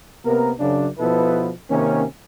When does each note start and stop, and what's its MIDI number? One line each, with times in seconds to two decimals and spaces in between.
0.24 0.52 48
0.24 0.52 58
0.24 0.52 59
0.24 0.52 70
0.59 0.87 42
0.59 0.87 49
0.59 0.87 62
0.99 1.50 47
0.99 1.50 53
0.99 1.50 59
0.99 1.50 64
0.99 1.50 69
0.99 1.50 71
1.70 2.04 48
1.70 2.04 51
1.70 2.04 58
1.70 2.04 61